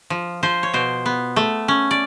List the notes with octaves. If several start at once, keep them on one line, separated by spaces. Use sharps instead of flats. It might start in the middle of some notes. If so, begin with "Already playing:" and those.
F3
F3 C5
C#5
B2 C5
B3
A3
C#4
D5